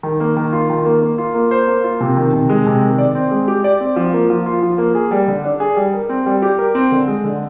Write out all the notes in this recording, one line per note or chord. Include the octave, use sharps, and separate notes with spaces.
D#3
A#3
D#3
F4
D#3
A#3
A#3
F4
A#3
C5
A#3
F4
C3
D#3
C3
G#3
C3
D#3
D5
C4
G#3
G4
D5
C4
F3
A#3
F3
F4
F3
A#3
G#4
G3
D3
D4
G#4
G3
A#4
C4
G3
G4
A#4
C4
D3
G#3
D3